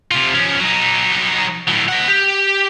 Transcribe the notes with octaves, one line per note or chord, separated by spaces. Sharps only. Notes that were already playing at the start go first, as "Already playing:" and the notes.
C3 F4
F3 C#4
F#3 D#4
A2 F#3
D#5 F#5
G4